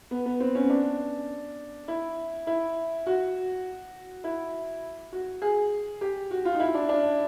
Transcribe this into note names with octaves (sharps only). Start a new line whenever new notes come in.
B3
B3
C4
C#4
D4
E4
E4
F#4
E4
F#4
G#4
G4
F#4
F4
D#4
E4
D4
D4